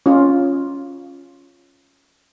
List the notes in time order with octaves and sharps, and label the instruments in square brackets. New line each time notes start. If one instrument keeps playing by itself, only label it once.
[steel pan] C#4 F4